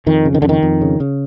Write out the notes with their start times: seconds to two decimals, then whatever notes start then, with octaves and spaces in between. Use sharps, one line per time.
0.06 F2 D#3
0.25 C#3
0.34 D#3
0.42 F2 D3
0.49 D#3
0.63 F2
0.81 C#3
1.00 C#3